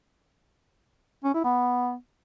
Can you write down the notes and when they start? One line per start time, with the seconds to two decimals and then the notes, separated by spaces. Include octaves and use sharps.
1.24 C#4
1.34 E4
1.44 B3